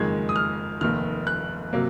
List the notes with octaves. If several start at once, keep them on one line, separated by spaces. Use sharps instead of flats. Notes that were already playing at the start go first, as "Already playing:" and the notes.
Already playing: F#1 F2 D#3 G#3 G#6
D#6
F6
F1 D#2 D#3 F6
F#6
C3 F#3 A#3